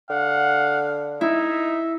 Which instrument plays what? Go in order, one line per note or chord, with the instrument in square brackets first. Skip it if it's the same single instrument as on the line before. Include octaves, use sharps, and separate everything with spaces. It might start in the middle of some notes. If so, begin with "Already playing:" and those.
[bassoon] D3 [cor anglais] F5 [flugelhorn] F#5
[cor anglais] D#4 [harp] E4 [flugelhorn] E5